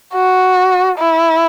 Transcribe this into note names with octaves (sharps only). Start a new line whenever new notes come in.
F#4
E4